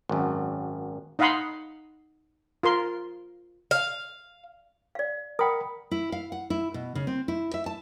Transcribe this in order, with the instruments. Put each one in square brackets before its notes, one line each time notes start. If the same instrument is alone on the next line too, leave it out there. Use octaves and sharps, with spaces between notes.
[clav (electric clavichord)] G#1 F#2
[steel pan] D#4 D#5 F5 F#5 B5 C6
F4 A#4 C6
[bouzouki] F5
[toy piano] D5 F5
[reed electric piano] A#4 B5 [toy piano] F#5 G5 D#6
[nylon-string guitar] E4
F5
F#5
E4
B2
C#3
C4
E4
E5
A5